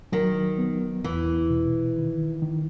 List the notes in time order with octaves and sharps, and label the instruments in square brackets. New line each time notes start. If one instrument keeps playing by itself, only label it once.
[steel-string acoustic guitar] D#3 [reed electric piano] F#3
[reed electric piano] B3
[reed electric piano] E2 [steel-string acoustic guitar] E3
[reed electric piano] B2
D#3
D#3